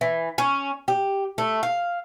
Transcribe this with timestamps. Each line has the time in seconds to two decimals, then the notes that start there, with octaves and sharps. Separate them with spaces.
0.01 E3
0.38 C#4
0.88 G4
1.38 A3
1.63 F5